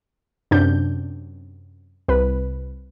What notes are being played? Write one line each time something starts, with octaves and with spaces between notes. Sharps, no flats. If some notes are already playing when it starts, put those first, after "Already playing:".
F#2 C3 D4 G6
C2 B4